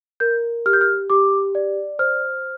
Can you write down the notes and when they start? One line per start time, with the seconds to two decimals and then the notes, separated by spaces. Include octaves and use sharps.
0.20 A#4 G6
0.66 G4 F6
0.73 G6
0.81 F6
1.10 G4 D6
1.55 D5
1.99 C5 F6